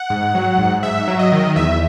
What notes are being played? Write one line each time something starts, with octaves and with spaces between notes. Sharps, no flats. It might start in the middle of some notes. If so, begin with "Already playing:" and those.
Already playing: F#5
G#2
F#3
G#2
G#2 E5
F#3
D#5
D#3
E2 E5